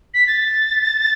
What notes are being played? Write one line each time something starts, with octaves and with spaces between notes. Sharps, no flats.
B6
A6